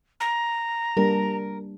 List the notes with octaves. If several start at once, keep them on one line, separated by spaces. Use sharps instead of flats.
A#5
G3 A#3 D4 A#4